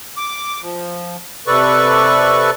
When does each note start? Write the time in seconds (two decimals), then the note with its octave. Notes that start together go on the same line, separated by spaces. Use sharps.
0.17 D6
0.62 F3
1.47 C3 A4 B4 D5 C#6